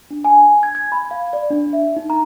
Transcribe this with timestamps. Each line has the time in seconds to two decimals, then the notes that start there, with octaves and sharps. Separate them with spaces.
0.11 D4
0.25 G#5
0.63 G#6
0.75 G#6
0.92 B5
1.11 F5
1.33 D5
1.50 D4
1.73 E5
1.96 D#4
2.10 A#5